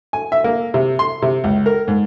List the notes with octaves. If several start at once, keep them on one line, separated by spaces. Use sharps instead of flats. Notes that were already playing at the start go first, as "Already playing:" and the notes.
G#5
E5
A#3
C3
C6
C3
C#2
A#4
G#2